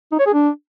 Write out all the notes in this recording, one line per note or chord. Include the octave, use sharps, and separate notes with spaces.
D#4
C#5
G#4
D4